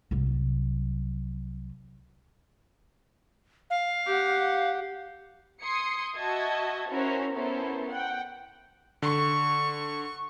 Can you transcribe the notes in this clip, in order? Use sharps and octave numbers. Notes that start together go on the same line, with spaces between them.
C2 F#3
F5
G4 F#5
C6 D#6 G#6 C7 C#7
F#4 D#5 E5 A5 G#6
C#4 E4 F#4 A#4 C5 C#5
B3 C#4 E4 A4 A#4 C5
F#5 G5
D3 C#6